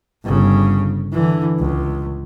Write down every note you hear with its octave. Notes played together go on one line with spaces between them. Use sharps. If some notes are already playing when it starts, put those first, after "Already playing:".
G1 C#3
D3 E3
C#2